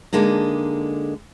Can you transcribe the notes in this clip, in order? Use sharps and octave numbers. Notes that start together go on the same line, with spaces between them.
D3 G#3 A#3 D4 D#4